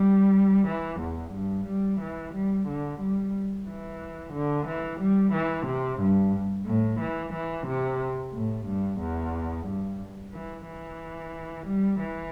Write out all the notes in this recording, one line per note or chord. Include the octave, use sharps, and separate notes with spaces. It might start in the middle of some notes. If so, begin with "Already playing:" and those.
Already playing: G3
E3
E2
G2
G3
E3
G3
D3
G3
E3
D3
E3
G3
E3
C3
G2
A2
E3
E3
C3
A2
G2
E2
G2
E3
E3
G3
E3